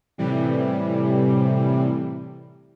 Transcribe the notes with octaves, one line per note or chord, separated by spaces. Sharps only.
A2 C3 E3 G3